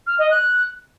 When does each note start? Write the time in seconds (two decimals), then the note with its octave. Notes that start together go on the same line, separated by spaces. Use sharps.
0.07 F6
0.19 D#5
0.31 F#6